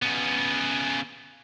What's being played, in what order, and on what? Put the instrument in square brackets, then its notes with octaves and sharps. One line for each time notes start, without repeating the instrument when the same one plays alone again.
[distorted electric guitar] C#3 B3